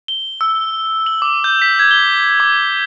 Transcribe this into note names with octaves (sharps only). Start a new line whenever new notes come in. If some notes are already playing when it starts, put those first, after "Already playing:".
G7
E6
F#7
D6
G6
B6
G#6
G7
D6